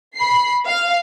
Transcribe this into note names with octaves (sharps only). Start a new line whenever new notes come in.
B5 C7
F5